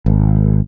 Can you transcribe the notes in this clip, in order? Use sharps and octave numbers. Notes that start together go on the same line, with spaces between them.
G#1